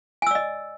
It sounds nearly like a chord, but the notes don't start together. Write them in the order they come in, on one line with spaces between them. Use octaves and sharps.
G#5 E6 D5 D#5